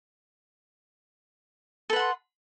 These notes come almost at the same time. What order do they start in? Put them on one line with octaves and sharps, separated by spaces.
A4 B4 F#5 C6